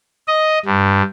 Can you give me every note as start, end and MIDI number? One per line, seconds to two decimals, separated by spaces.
0.28 0.59 75
0.65 1.02 43